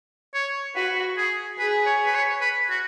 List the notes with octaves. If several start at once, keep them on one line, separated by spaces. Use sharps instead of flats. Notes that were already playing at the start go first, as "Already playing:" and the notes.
C#5
F#4 B4
G#4
G#4 B4
C#5
B4
C#5
B4
F#4